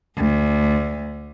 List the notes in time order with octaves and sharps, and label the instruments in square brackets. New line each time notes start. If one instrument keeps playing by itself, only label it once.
[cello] D2